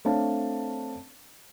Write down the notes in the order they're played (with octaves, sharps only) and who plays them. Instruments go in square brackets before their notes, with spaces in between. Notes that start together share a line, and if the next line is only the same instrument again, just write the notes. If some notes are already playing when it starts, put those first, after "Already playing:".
[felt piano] A3 C4 D4 C#5 F5 A5